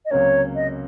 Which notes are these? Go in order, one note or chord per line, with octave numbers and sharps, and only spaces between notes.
D#5
C#2 C3 F#3 A#3 C#4 C#5
D#5